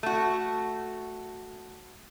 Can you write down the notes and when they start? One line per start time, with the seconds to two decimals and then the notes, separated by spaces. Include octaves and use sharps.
0.03 A3 F#4